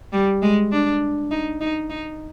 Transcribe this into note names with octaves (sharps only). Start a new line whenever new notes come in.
G3
G#3
D4
D#4
D#4
D#4